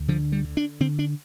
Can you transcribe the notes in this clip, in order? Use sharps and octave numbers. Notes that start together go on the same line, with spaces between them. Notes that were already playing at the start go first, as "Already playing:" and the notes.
Already playing: D2
D3 F3
G3
D3
D4
D3 C4
D4